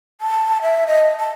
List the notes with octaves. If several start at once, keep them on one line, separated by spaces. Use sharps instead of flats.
A5
E5
D#5
A5